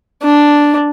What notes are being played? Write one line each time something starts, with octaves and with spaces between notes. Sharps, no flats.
D4